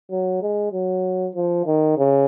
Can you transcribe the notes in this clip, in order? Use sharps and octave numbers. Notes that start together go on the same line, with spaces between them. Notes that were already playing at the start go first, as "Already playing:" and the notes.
F#3
G#3
F#3
F3
D#3
C#3